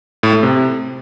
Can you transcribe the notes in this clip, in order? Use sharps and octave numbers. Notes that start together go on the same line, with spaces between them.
A2
A3
C3